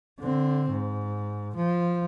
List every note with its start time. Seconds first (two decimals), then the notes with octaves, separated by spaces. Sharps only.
0.19 D3 C4
0.70 G#2
1.55 F3